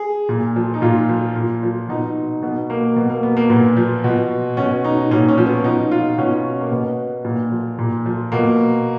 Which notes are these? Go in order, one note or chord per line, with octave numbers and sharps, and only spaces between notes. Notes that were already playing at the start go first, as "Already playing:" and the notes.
Already playing: G#4
A#2
F3
D#4
A#2 F4
F3
A#2
F3
B2 D#4
B2 B3
A#3
B2 B3
A#3
B3
A#3
A#2 B3
F3
B2
B2 C#4
D#4
A#2 C#4
C#4
F3
B3
B2 D#4
F4
B2 C#4
A#3
B2 B3
A#2
F3
A#2
F3
B2 A#3